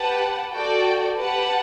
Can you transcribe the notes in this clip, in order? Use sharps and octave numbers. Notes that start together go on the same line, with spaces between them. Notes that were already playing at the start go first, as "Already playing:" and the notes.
Already playing: G4 B4 F#5 A5
F#4 A4 D5 G5
G4 B4 F#5 A5